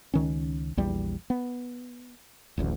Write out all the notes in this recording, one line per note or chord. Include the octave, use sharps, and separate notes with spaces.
C#2 D#3 C#4
A#1 E2 G3
B3
D1 A1 D2